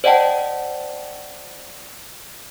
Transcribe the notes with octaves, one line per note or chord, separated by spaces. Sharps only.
C5 D5 D#5 F#5 G5 A5